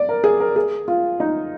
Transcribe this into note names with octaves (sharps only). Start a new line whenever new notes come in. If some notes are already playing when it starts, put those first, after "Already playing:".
Already playing: D5
A#4
G#4
A#4
G#4
F4
D#4